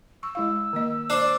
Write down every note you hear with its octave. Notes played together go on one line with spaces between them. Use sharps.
C#6 E6
G#3 E4 F5
D#3 A#3 D#5
D4 C5 D5